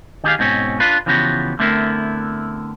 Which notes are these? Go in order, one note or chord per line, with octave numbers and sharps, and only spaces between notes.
D#3 D#4 G4 G#4 F5
G#2 B2 C4 C#4
D4 F4 B4
C#3 E3 F3 B3 F#4 G4
D3 A3 B3 C4 E4 A#4